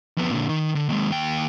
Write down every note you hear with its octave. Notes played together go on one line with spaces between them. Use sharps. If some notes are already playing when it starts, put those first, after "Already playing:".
F2 B3
A#2 D3
D#3
D3
D#2 G#3
D#2 G5